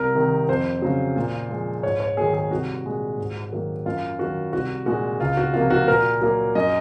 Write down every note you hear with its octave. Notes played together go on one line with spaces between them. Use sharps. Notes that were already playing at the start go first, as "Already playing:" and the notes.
Already playing: C2 A#4
C3 D#3
F2 C5
C#3 F#3
A#2
F3 G#3
G#2 C#5
C#5
D#3 F#3 A#3 G#4
G#4
C2 F#4
A#2 G#3
G#2
D#3 F#3 A#3
F#2 F4
D#3 F#3 F#4
C2 F#4
A#2 G#3 F#4
C#2 F4
F#4
C3 F3 A#3 F4
F#4
A#2 A#4
F#3 A#3
F#2 D#5